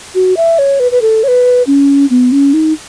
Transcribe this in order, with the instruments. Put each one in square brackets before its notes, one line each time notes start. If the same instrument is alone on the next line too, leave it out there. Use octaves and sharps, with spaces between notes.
[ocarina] F#4
E5
C#5
B4
B4
A4
C#5
B4
C#4
B3
C#4
D#4